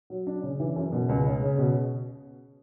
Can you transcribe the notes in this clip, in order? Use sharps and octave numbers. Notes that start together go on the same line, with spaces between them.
F#3
D4
C#3
E3
F#2
B2
C#2
C#3
C#3
B2